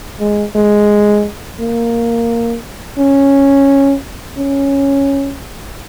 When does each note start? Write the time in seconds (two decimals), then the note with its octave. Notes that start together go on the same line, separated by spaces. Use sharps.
0.20 G#3
0.55 G#3
1.60 A#3
2.98 C#4
4.37 C#4